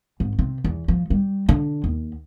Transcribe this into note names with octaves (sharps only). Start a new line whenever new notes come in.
G#1
C3
E2
F3
G3
D3
D#2